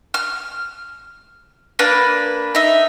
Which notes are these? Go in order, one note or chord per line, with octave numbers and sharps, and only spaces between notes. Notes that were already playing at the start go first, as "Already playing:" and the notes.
F6
A#3 D4 B4
D#4 E5